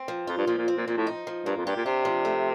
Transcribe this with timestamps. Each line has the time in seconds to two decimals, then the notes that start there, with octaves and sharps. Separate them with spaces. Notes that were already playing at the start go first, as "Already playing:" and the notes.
Already playing: C4
0.08 F3
0.27 F2 F4
0.38 G2
0.47 A#2 F3
0.58 A#2
0.68 C4
0.77 A#2
0.87 A#2 F3
0.97 A2
1.07 D#4
1.27 F3
1.46 G2 A#3
1.57 F2
1.66 G2 G4
1.76 A#2
1.85 C3 D4
2.05 F3
2.25 A3